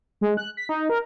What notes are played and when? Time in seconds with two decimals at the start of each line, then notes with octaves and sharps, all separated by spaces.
0.21 G#3
0.37 F#6
0.57 B6
0.69 D#4
0.90 A#4